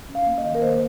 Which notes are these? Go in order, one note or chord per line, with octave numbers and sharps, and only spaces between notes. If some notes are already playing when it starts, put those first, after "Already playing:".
C#4
F5
A#3
D#5
D#3
A#4
A#3 C5